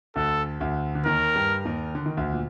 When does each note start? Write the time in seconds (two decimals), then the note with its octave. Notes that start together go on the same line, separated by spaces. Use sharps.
0.16 D2 D3 A4
0.60 D2 D3
0.95 D3
1.05 D#2 D#3 A#4
1.35 G2 G3
1.65 D#2 D#3
1.95 D3
2.06 D#3
2.17 D2 D3
2.33 A#2